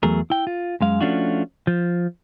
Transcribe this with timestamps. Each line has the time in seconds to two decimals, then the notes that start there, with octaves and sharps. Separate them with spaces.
0.03 E2 F#3 A3 G#4 A#4
0.30 E4 G5
0.47 F4
0.81 F#2 G#3 F5
1.01 F3 A3 C#4 D4 F4 F#4
1.67 F3